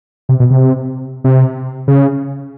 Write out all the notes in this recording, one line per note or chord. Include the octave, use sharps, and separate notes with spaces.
C3
B2
C3
C3
C#3